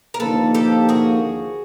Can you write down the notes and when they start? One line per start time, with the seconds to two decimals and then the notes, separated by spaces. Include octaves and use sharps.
0.14 A#4
0.20 D#2 D3 F3 A#3 A4 B4
0.54 G4 A4
0.89 F#4 G#4